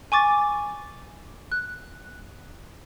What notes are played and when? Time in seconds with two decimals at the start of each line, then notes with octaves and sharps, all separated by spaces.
0.12 G#5 C#6 D6 A6
1.52 F#6